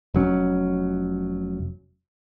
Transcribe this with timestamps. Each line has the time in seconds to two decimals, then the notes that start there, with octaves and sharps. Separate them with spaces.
0.14 F1 F#3 C#4